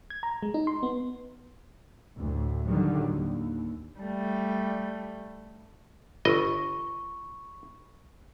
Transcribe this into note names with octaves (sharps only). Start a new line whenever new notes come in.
G#6
A#5
G#3
D#4
C6
B3
D2 A2
A2 D3 D#3 F#3 G3
D#2
G3 A3
G1 D#5 B5 C#6